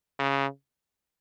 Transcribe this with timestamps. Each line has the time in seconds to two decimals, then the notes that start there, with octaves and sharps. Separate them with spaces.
0.19 C#3